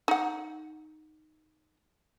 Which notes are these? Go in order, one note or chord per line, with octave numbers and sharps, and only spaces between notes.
D#4 F#5